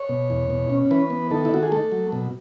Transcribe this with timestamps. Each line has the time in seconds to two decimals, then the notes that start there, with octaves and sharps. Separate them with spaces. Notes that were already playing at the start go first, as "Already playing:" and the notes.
Already playing: C#5
0.09 B2
0.30 E2
0.50 B2
0.70 C#4
0.91 E3 B4
1.10 B3
1.31 D#3 A4
1.45 E4
1.51 D#3 F#4
1.63 G#4
1.72 A3 A4
1.92 F#3
2.12 B2